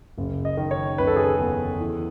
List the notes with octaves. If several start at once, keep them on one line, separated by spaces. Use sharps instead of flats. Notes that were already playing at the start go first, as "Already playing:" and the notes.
F#1
D#5
D#3
C#5
F#1 B4
A4
G#4
A4
E2
E3